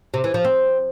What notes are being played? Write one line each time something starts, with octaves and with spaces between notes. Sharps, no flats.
C3
E3
F3
C4